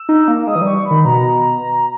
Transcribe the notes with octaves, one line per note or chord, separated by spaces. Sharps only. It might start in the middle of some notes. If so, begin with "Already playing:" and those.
Already playing: E6
D#4
A#3
G#3 D#6
E3
G3 C#6
B5
D#3
B2 A#5